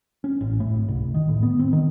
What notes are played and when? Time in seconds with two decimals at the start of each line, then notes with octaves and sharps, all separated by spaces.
0.24 C#4
0.41 A1
0.60 A2
0.74 G#1
0.88 C2
1.00 F1
1.14 D#3
1.28 A2
1.43 B3
1.59 C4
1.73 D#3